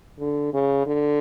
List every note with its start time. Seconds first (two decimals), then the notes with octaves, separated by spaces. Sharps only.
0.20 D3
0.53 C#3
0.86 D3